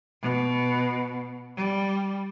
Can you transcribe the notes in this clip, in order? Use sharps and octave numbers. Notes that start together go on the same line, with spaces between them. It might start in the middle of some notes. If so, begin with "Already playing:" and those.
B2
G3